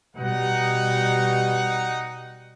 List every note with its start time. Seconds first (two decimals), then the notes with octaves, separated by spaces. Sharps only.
0.15 B2 G3 D#4 F#5